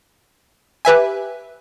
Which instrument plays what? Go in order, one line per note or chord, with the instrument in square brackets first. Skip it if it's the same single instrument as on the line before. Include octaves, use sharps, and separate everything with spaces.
[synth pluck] G4 B4 E5 G#5